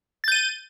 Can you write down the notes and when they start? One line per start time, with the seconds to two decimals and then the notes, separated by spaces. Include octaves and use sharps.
0.24 A6
0.28 G6
0.32 D#7